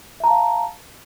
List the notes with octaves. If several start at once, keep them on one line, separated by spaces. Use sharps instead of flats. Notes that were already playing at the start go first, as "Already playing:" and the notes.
E5 F5 A5 A#5